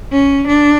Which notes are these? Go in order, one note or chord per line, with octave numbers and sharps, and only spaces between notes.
C#4
D4